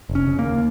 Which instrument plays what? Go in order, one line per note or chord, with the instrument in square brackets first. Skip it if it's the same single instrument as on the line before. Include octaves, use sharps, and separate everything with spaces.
[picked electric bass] F1
C#4
C#3
A#3
D#2